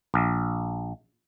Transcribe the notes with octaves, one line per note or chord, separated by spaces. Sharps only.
A#1